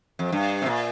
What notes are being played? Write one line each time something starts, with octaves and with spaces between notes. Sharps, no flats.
F2
G2
C3
A#2